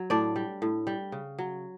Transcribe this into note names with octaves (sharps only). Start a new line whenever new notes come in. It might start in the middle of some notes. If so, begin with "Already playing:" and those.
Already playing: F#3
A2 D4 D5
G3
A2
G3
C#3
F#3